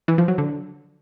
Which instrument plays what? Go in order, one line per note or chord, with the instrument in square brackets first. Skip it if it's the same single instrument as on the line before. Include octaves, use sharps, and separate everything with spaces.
[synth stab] E3
F3
F#3
D3